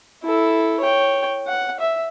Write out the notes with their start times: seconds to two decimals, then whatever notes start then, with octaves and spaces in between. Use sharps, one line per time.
0.24 E4 A4
0.80 C#5 G5
1.47 F#5
1.80 E5